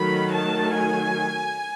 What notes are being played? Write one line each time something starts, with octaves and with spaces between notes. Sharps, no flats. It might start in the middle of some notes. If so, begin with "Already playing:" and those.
Already playing: D#3 F#3 A3 B5
A5
G#5